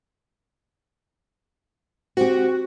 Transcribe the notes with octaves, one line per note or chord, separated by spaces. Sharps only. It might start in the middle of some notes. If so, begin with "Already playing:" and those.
C4 F#4 G4